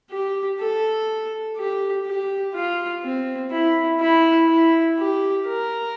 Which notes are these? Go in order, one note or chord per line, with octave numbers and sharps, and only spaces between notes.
G4
A4
G4
G4
F4
C4
E4
E4
E4
G4
A#4